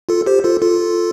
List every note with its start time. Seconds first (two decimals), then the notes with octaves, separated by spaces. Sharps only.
0.09 F4 A4
0.26 G4 C5
0.44 F4 A4
0.62 F4 A4